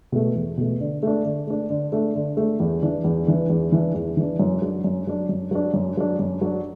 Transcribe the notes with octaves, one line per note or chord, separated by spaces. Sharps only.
B2 A3
E2
B2 A3
D3
A3 D4
D3
A3 D4
D3
A3 D4
D3
A3 D4
E2
E3 D4
E2
E3 D4
E2
E3 D4
E2
E3 D4
F#2
F#3 D4
F#2
F#3 D4
F#2
F#3 D4
F#2
F#3 D4
F#2
F#3 D4